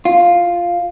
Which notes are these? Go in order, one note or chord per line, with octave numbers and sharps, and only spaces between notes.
F4